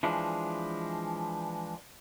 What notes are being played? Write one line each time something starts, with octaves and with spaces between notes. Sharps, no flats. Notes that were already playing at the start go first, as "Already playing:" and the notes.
E3 F3 G#3 D4